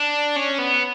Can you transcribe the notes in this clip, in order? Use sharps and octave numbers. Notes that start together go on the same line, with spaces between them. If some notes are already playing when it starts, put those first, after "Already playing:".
Already playing: D4
C#4
B3